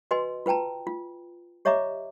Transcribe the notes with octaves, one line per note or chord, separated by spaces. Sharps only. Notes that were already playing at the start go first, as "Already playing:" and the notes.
F#4 B4 D#5 G#5 C6
F4 B4 G5 A5 A#5
F4
G4 C#5 D#5 E5 A#5 D6